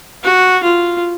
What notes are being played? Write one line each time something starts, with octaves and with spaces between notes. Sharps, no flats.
F#4
F4